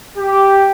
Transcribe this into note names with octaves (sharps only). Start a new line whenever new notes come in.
G4